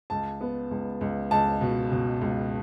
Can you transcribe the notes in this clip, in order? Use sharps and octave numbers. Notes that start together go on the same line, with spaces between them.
C#2 A5
B3
C#2
C#2
C#2 A5
B2
B2
C#2